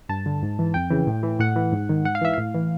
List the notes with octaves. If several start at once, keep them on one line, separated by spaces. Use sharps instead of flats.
G2 A5
D3
G#2
E3
F2 G5
C#3 E3
A2
E3
A2 F#5
E3
G#2
D#3
G#2 F#5
F5
E3 E5
A2 F5
E3